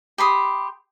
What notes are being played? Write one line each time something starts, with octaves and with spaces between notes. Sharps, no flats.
G4 B5 C6 D#6